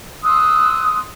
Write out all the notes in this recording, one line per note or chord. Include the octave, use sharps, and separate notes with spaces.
C6 D#6 E6 F#6